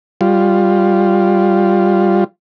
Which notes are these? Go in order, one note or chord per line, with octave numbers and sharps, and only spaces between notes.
G3 F4